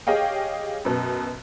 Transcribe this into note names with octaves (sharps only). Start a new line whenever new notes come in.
G4 G#4 C#5 D#5 F5 G5
F#2 B2